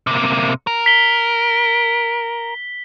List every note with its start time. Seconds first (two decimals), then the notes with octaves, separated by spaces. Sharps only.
0.07 C3 A#3
0.67 A#4
0.86 B6 G7